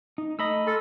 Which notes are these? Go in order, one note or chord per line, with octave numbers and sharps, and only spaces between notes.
D#4
A3 D#5 A#5 B5 E6
A4 G#5 C6 F6